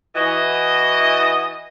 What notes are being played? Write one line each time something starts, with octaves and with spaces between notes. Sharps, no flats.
E3 F#4 D#5